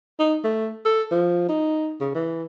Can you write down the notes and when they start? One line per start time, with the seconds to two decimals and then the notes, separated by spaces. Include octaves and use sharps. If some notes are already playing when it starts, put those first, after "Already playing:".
0.19 D#4
0.44 A3
0.85 A4
1.11 F3
1.49 D#4
2.00 C#3
2.15 E3